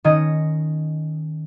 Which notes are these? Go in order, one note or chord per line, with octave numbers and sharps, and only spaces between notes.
D#3 C#4 D#5 D#7